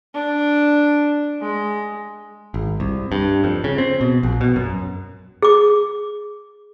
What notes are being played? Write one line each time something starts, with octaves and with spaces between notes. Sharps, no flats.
D4
G#3
G#1
C2
G2
F2
C#3
C4
B2
A#1
B2
F#2
G#4 D6